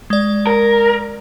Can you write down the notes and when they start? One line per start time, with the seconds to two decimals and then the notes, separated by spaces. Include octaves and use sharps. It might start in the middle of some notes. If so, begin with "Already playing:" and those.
0.10 G#3 D5
0.47 A#4